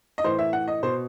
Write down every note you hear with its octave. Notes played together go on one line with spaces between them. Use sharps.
D#5
A2 E3 C5
E5
F#5
D#5
B2 C5